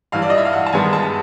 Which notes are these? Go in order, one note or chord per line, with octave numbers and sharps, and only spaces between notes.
G2 E3 G3 F5
D5
D#5
E5
F5
F#5
A5
G2 D#3 G#3 B3 G#5
A5